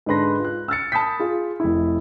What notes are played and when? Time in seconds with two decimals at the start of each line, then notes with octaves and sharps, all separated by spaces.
0.06 G#2 D3 D4 B4 C6 A#6
0.40 F4 F#6
0.68 E6 F6 A6 C#7
0.92 A5 B5 D#6 G6 B6
1.20 F4 G#4
1.60 F1 E4